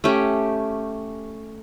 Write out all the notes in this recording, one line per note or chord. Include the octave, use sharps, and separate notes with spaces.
A3 C#4 G4